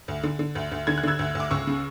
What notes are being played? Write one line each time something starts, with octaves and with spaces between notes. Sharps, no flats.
D2
D3
D3
D2
D2
D3 G#6
F#6
D3 E6 G#6
D2
D2
D6
C#2 C#6 E6
C#3